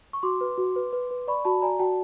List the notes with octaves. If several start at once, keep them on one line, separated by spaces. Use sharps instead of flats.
C#6
F#4 C6 D6
B4
F#4
B4
B4
B4
D5 B5 C#6
F#4 A5 B5
D5 G#5 A#5
F#4 G5 A5